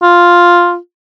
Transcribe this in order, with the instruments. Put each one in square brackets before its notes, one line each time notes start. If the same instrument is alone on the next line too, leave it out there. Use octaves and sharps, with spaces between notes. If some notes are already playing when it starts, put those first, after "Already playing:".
[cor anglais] F4